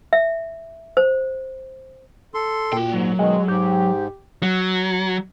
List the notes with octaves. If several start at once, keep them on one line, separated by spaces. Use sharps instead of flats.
E5
C5
A4 C6
A#2 F#4 G5
G#2 F#3
B2 D#3 G#3
G#2 G4
F#3